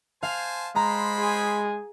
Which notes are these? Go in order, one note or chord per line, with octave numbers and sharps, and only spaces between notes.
C5 F5 G#5 A5
G#3 C5 A#5 B5
G#4